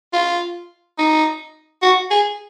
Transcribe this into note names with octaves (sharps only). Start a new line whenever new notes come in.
F4
D#4
F#4
G#4